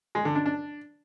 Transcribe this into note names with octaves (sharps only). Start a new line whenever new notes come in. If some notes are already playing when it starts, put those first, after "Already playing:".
G#3
D3
D4
D4